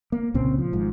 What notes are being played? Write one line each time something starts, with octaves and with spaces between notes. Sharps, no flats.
A#3
C2 A#2 C#3 C4
F3
G#1 G#2 F3